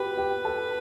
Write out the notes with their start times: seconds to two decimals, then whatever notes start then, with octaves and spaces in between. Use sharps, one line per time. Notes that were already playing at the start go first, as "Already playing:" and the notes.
Already playing: F#4 G4 B4
0.17 G4
0.45 A4